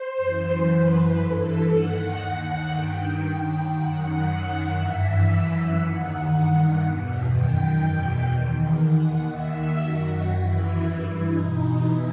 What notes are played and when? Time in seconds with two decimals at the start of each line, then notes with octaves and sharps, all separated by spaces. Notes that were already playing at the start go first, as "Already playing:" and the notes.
Already playing: C5
0.18 F#2 E3
0.68 F#2 E3 B4
1.19 G2 E3 A4
1.69 D#2 D#3 F#5
2.20 D#2 D#3
2.71 G2 D#3 G5
3.22 D#2 D#3
3.72 F#2 D#3 F#5
4.24 F#2 D#3
4.73 G2 E3 E5
5.24 F#2 E3 E5
5.75 D#2 D#3 F#5
6.26 G2 D#3
6.77 E2 B2
7.27 F#2 D#3 G5
7.78 E2 B2
8.29 E2 D#3
8.79 D#2 D#3 F#5
9.30 D#2 D#3 E5
9.80 F#2 D#3 F#4
10.30 F#2 E3 E4
10.81 G2 E3 E4
11.32 E2 B2 D#4
11.82 E3 E4